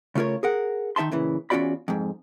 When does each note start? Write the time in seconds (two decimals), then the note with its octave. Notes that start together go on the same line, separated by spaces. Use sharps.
0.15 C#3 A3 F4 A#4 C#5
0.43 G#4 A#4 F#5
0.96 D#3 D#4 E5 A5 C6
1.12 A#2 C#3 E3
1.50 E2 C#4 F4 F#4 D5 B5
1.88 F2 G#2